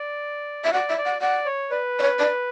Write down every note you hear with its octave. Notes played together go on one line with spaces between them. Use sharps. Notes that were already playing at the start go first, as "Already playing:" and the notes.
Already playing: D5
E5
D5 F#5
E5
D5
F#5
D5 F#5
C#5
B4 D5
D5
C#5
D5